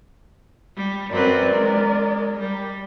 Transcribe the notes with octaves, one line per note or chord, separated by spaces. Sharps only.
G3
F#2 C4 A#4 B4 D5
G#3
G3